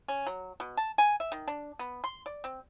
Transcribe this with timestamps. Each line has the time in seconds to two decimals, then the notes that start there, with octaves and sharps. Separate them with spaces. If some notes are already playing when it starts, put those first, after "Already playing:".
0.08 C#4
0.27 F#3
0.60 B2
0.77 A5
0.98 G#5
1.20 E5
1.32 D#3
1.48 D4
1.79 B3
2.04 C6
2.26 D5
2.44 C4